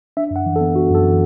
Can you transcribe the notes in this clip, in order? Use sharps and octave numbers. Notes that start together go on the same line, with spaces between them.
D4 E5
F#2 F#5
E3
A4
B3
D4 F#4
F#2 A4
E3